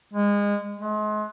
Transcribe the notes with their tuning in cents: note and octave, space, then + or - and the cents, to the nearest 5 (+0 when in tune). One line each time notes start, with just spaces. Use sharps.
G#3 -25
G#3 +35